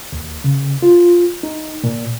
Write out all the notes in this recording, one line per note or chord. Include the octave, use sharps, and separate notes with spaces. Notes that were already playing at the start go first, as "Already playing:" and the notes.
D#2
C#3
F4
D#4
A#2